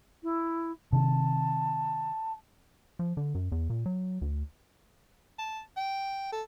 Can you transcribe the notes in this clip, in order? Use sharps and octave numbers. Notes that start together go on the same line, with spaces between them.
E4
C3 D#3 A5
F3
D3
F#2
E2
A#2
F#3
D2
A5
G5
A4